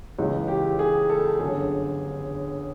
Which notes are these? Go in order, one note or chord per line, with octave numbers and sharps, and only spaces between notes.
C#2 C#3 E3 G#3
G4
G#4
A4
G1 F#2 D3 G#4